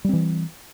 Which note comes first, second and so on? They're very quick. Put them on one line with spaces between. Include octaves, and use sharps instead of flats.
G3 C4 E3